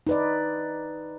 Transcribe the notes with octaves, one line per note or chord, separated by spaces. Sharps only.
D#4 B4 D5